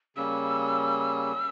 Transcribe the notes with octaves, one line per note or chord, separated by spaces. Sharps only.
C#3 G3 A#3 C#4 E6